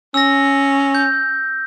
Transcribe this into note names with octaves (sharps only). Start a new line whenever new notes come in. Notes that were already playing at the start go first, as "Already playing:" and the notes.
C#4 E6 A#6
G6